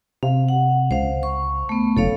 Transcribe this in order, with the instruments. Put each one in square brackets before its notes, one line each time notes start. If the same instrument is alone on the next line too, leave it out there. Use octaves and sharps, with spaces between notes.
[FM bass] C3 [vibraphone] F5
[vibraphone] F#5
[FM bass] C#2 [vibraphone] C5 F5
[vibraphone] C#6
A3 B3
[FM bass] F#1 [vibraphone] A4 C#5 F5